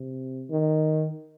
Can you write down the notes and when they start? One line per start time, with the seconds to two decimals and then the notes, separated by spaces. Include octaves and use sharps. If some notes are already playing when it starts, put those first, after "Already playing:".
Already playing: C3
0.50 D#3